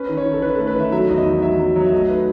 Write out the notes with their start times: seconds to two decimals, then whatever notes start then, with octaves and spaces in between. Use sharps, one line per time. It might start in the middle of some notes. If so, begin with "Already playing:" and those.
Already playing: C#4 B4
0.09 D#3
0.17 C#5
0.25 D#3
0.33 A4
0.42 D#3 B4
0.55 A3 A4
0.67 B4
0.75 D#3 E5
0.92 F#3 E5
1.09 E2
1.18 D#5
1.26 D#3
1.42 F#3 E5
1.59 F#3
1.76 F#3
1.86 E5
1.92 A3 D#5
2.09 D#4 B4